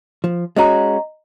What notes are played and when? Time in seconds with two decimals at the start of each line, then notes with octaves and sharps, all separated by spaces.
0.24 F3
0.56 G#3 C#4 F#4 D#5 A#5